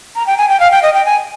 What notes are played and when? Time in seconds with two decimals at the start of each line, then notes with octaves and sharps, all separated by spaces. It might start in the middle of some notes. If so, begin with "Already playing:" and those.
0.16 A#5
0.27 G5
0.38 G#5
0.49 G5
0.60 F5
0.72 G5
0.83 D#5
0.94 G5
1.06 G#5